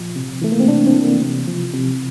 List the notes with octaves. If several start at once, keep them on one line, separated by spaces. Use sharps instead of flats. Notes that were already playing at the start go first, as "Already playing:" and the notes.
Already playing: A#2 F3
C3
E3 A3
A#3
C4
C3 D4
C4
E3
A#3
C3
F3
C3